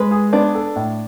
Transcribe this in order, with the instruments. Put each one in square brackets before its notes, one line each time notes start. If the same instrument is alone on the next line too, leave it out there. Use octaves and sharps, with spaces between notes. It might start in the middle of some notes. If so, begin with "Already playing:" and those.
Already playing: [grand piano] G#3 [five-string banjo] B4
[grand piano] G#4
[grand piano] B3 [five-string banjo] D4
[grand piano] A4
A2